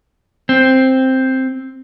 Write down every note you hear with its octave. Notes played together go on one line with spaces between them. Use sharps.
C4